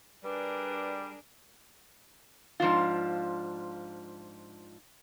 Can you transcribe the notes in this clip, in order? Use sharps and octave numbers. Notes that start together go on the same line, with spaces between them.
G3 D4 G#4 A#4 B4
G#2 F3 D4 F4